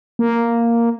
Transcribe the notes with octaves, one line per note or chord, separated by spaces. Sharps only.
A#3